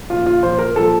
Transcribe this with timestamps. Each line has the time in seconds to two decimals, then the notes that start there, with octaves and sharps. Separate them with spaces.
0.10 A#2 F3 F4
0.26 F4
0.42 A#2 F3 C5
0.59 A#4
0.76 A#2 F3 A4